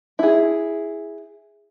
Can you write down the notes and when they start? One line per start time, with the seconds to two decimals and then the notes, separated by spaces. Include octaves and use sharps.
0.19 E4 G#4